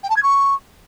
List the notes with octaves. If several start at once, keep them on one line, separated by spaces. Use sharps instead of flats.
G5
A5
G#6
C#6